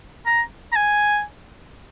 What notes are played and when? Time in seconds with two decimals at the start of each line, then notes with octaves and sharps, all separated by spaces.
0.26 A#5
0.72 A#5
0.76 G#5